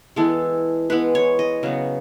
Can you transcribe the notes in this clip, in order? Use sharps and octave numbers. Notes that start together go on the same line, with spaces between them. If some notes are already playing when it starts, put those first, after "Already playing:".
E3 G#3 B3 A4
E3 G#3 B3 B4
C#5
D#5
C#3 F#3 B3